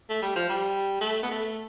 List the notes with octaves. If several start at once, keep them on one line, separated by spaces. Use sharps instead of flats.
A3
G3
F3
G3
A3
B3
A3